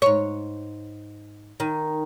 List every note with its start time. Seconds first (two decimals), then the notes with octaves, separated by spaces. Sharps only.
0.02 G#2 C#5
1.60 D#3